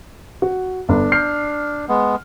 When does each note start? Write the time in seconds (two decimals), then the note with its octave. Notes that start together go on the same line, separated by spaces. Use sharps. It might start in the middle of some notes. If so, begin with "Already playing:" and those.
0.42 F#4
0.89 G1 D4
1.12 F6 G6 C7
1.88 G#3 B3